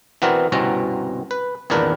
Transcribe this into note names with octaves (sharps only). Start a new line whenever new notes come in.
E3 B3 C4 F#4 A#4 D5
G1 C2 B2 C4 C#4 A#5
B4
G#1 E2 A#2 D4 A#4 B4